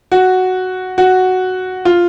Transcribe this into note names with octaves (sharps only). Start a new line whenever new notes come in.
F#4
F#4
F4